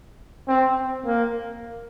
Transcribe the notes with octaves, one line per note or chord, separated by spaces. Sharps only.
C4
A#3